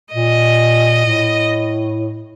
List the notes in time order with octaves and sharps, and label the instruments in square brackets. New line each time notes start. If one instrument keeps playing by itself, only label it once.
[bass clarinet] A#2 [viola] D#5
[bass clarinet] A2